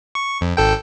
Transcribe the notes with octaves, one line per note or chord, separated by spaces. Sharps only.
C#6
F2
G#1 A4 G5